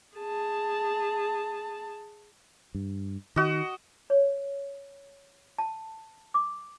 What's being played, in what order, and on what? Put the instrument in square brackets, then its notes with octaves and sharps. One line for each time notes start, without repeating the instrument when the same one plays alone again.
[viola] G#4 A5
[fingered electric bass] G2
[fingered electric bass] D#3 [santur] F#4 D#5
[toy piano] C#5
A5
D6